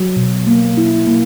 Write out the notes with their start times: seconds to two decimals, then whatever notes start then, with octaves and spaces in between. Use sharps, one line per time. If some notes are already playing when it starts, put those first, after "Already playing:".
Already playing: F#3
0.17 B2
0.47 A#3
0.77 E4
1.07 A#3